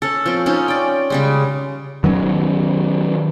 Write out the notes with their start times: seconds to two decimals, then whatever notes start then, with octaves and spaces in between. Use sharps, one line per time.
0.02 C#4 A4
0.26 F3 C4
0.46 C#4 D#4 F4
0.68 D5 G5
1.10 C#3 G3 G#3
2.04 D#3 F#3 G3 C#4